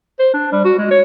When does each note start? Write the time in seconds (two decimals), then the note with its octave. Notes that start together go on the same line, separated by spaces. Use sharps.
0.19 C5
0.34 D4
0.53 G3
0.65 F#4
0.79 G#3
0.91 C#5